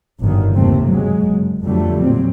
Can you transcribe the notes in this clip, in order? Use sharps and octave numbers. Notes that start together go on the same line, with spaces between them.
G1 D#3 F#3
F#1 D#2 C3 A3 C4
F#3 G#3
F#1
F2 D3 F#3 G3 A3
A#2 F#3 C4